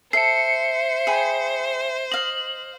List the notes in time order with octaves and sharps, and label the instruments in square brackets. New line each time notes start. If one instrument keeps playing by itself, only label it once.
[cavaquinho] A4 [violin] C5 [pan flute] E5 [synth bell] C7 C#7
[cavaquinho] G#4 G5 B5
[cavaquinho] D#5 F5 [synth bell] F#7